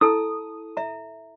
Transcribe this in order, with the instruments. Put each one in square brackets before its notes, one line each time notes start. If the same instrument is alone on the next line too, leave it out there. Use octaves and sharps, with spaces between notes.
[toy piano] E4 A4 A5 [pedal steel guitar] D#6
[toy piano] E5 A#5